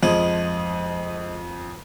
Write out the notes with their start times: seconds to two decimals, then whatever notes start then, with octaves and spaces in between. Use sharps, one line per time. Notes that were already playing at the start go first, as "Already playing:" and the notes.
0.03 F2 F3 G#3 G#4